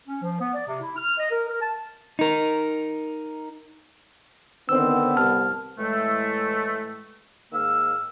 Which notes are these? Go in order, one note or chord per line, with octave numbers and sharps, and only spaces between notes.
C#4
F3
B3
D5
C3
E4
F6
D#5
A#4
A#4
A5
D#4 A#4
D3 D#3 B3 C4 E6
C2 A5 F6
A2 E3 G#3 A3
G#2 D#3 A#3 F5 E6